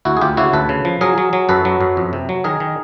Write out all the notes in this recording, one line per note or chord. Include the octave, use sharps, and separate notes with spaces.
D2 E4 F#4
G#4
D2 F4 G4
C#3 E4 F#4
D2 A4 B4
C#3
F3
F#3 G#4 A#4
F#3
F#3
F#2 A4 B4
F#3
F#2
F2
C3
F#3
D#3 G#4 A#4
D#3